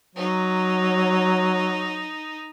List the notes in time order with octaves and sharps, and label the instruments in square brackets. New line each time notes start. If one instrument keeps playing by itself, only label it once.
[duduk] F#3 [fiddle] D#4